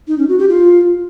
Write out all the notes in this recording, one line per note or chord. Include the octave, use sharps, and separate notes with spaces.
D#4
C#4
F#4
G4
F4